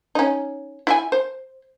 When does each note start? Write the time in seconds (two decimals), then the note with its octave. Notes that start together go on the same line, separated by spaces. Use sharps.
0.15 C#4 D#4
0.87 E4 E5 G#5
1.12 C5